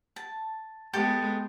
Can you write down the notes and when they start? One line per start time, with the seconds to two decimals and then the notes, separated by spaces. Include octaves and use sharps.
0.16 A5
0.93 G#3 B3 G4 A4 D6